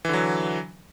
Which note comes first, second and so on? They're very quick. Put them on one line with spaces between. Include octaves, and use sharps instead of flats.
E3 D3 F#3